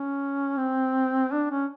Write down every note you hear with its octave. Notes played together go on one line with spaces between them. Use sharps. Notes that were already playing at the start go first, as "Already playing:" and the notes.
Already playing: C#4
C4
D4
C#4